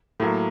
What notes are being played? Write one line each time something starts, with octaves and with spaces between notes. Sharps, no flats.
A2 F#3 A#3